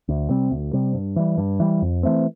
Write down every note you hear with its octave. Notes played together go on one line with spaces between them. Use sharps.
D2
C3 G3 C4
D2
C3 G3 C4
G2
E3 G3
G2
E3 G3
F2
E3 A3 C4